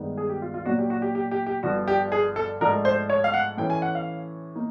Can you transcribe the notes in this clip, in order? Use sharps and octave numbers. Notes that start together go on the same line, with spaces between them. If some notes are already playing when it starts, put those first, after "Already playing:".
Already playing: G2 D#3 G#3 B3 D#4
G#4
G4
F4
F4
A#2 F#3 A#3 D4 F4 F#4
G4
F#4
G4
G4
G4
G4
G1 G2 D3 F3 F#4
G4
G#4
A4
G#2 F3 A3 D4 A#4
C5
C#5
F5
F#5
A2 E3 A3 C#4 E4 G5
G#5
F#5
F5
A#3 D#4